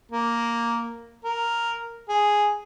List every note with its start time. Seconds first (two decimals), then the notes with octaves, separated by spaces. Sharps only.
0.11 A#3
1.24 A#4
2.09 G#4